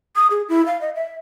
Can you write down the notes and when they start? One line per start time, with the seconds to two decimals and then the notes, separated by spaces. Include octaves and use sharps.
0.16 D#6
0.31 G#4
0.49 E4
0.66 F5
0.81 D#5
0.95 E5